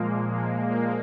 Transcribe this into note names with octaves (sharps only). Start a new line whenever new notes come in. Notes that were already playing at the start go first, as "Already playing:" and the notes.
Already playing: A#2 F3 G#3 A#3
A#3
A#3